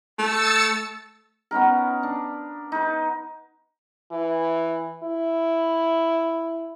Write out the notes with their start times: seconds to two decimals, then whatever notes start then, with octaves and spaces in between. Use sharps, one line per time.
0.19 A3 E6 A6 C#7
1.51 B3 C#4 D#4 A#4
2.03 D4
2.72 D#4 B4
4.11 E3
5.03 E4